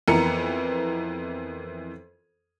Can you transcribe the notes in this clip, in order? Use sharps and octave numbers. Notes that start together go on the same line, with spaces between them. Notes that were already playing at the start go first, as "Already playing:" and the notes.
F2 E3 B3 A#4 C#7